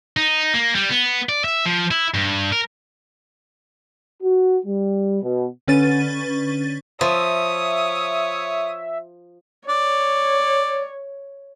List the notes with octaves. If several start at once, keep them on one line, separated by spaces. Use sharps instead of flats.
D#4
A#3
G3
B3
D5
E5
F3
E4
G2
A#4
F#4
G3
B2
D3 C#4 B4 A6 D#7
F3 C#5 E5 D#6
C#5 D5